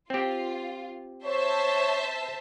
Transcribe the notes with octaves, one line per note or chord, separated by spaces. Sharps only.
C4 F4 G4
C5 C#5 E5 A5